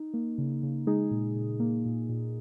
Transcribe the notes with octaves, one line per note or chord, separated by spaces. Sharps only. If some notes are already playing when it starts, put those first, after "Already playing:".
Already playing: D#4
A#3
C#3
C#3
G#3 D#4 G#4
A#2
A#2
A#3
A#2
A#2